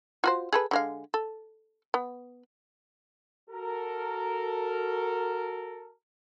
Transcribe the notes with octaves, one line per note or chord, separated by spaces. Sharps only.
F4 F#4 C5
G#4 A4 B4
D3 G#3 F5
A4
B3
F#4 A4 A#4